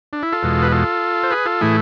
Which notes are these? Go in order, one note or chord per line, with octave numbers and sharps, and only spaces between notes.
D4
E4
F4 A4
E2 B2 G#3
B4
F4 A4
C5
G#4 B4
F4 A4
A2 E3 A3 E4 G#4